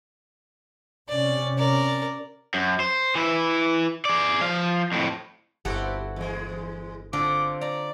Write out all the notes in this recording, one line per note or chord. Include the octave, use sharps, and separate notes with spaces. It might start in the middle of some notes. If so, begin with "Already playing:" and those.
C3 C#4 D5
A#4 D5
F#2
C5
E3 E4
G#4 D5
F3 F5
F2 A2
G1 C4 E4 F#4 G4 A4
E2 G#3
D3 C4 F4 A4 D6
D5 A#5